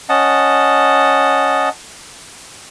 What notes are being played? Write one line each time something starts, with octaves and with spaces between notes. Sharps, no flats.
C#4 D#5 F#5 A5